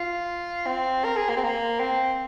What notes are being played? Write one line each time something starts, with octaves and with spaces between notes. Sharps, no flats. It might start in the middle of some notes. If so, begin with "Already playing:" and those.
Already playing: F4
C4
A#4
G#4
A#3
C4
A#3
C4